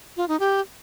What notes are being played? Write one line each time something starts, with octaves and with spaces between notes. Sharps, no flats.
F4
D#4
G4